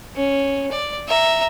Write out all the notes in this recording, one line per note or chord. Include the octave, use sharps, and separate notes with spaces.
C#4
D5
E5 A#5